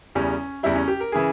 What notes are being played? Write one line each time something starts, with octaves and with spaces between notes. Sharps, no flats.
E2 C#3 G3 C#4
E2 C#3 G3 E4
C#4
G4
A#4
C#3 E3 G#4